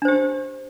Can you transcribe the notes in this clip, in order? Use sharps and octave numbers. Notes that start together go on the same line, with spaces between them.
D4 G4 C5